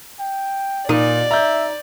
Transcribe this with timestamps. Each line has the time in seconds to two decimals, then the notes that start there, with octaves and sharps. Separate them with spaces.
0.19 G5
0.89 A#2 D#4 D5
1.31 E5 A#5 G6